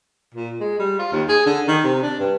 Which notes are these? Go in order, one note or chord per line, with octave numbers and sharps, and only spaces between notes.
A#2
G#3
G3
F4
D#2
G#4
D3
D#3
C3
D4
G2